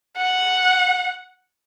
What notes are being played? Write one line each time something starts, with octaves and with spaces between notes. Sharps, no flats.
F#5